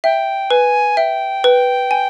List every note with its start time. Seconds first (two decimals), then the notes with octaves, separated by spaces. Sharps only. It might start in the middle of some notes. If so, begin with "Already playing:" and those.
0.04 E5 G5
0.50 B4 G#5
0.97 E5 G5
1.44 B4
1.91 G#5